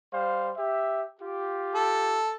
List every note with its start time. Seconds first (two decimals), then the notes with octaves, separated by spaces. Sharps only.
0.13 G3 C5 F5
0.57 G4 E5
1.21 F4 G4
1.75 A4